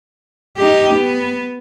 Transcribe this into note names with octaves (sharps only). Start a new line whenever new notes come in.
D#4 G4
B3